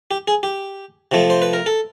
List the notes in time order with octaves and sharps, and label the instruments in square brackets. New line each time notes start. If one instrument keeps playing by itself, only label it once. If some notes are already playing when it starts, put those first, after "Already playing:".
[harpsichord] G4
G#4
G4
C3 F3 A3
C5
B4
A#4
A4